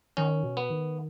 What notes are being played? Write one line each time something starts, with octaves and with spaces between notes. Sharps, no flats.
D#3 C#4
B2
B3
D#3